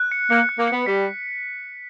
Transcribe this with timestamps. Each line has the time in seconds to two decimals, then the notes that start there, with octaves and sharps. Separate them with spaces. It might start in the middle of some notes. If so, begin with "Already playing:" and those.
Already playing: F#6
0.11 C#7
0.30 A#3 C#7
0.49 F#6
0.59 A#3
0.68 C#7
0.73 B3
0.86 G3 B6